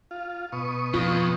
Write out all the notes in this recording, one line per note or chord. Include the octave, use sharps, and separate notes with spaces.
F4
B2 C#6 D#6
F2 F4